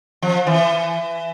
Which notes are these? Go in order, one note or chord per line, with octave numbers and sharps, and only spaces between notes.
F3
E3